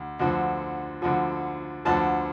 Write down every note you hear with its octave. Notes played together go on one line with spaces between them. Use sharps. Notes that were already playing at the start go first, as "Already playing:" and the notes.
Already playing: D2
D2 D3 F3
D2 D3 F3
D2 D3 F3 A5